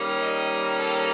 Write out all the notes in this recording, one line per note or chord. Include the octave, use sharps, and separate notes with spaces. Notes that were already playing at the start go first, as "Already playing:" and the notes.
Already playing: D#3 G3 A#3 C#4
D#5
A4